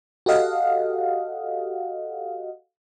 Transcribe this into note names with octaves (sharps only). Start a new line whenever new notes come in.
F#4 G4 A4 D#5 F5 F#5